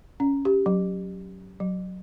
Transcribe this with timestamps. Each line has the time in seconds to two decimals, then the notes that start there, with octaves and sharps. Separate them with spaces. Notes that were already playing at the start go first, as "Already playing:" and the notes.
0.20 C#4
0.45 G4
0.66 F#3
1.60 F#3